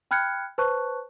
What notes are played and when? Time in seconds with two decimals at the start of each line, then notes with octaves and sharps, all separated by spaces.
0.11 G5 B5 F6 F#6 G#6 C#7
0.58 B4 C5 A5 C#6 F#6